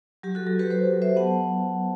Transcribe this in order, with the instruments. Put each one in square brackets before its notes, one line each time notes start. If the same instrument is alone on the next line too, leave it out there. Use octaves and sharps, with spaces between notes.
[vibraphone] F#3 G4
F#4 A4
F#3 G4
G4 B4
F#3 A4 C5
F#3
C5 E5
B3 F#5 A5